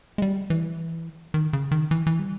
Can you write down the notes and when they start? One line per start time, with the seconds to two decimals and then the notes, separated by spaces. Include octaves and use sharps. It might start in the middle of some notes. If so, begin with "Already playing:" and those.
0.18 G#3
0.22 G3
0.50 E3
1.34 D#3
1.53 C#3
1.71 D#3
1.91 E3
2.07 E3
2.19 G3